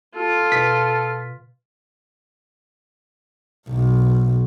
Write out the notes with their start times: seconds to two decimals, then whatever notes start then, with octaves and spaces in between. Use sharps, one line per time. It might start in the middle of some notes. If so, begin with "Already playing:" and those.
0.15 F4 A4
0.52 B2 B6
3.69 B1